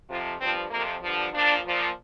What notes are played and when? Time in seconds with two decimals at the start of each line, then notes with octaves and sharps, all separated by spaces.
0.09 F2 C3 F3 F4
0.40 G2 F3 C4
0.70 F2 C3 F3 A#3
1.01 G2 D3 F3
1.32 A#2 F3 D4
1.63 A#2 F3